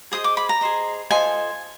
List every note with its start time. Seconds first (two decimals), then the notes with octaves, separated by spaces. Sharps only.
0.12 G#4 C5 D#5 D#6
0.24 D6
0.37 B5
0.49 A#5
0.61 G#4 C5 D#5
1.11 F4 A4 C5 D#5 G#5